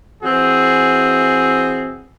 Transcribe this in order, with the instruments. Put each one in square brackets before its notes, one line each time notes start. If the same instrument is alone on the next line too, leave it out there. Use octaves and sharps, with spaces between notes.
[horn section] E3 C4 F#4 G#4